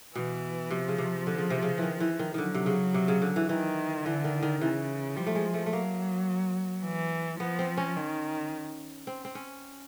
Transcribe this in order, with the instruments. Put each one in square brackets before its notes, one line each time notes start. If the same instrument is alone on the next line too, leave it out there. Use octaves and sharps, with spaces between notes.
[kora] B2 [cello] E3
[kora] C3 [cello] F3
[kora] C#3
C3
D3
C#3
C3
C#3
D#3 E3
E3
D#3
[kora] D3 D#3 [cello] F#3
[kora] C3
C#3
C3
C#3
D3
E3
[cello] D#3 [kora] E3
[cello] D3 [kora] E3
[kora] D#3
D#3
[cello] C#3 [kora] E3
[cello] F3 [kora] G3
[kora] A3
G#3
A3
A3
[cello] F#3 [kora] A#3
[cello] E3
[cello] F3 [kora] B3
[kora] C4
C#4
[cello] D#3
[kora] C4
C4
C#4